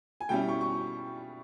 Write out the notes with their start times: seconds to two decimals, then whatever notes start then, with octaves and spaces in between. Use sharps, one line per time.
0.21 G#5
0.29 B2 G3 C#4 E4 G5
0.49 C#6
0.61 C#6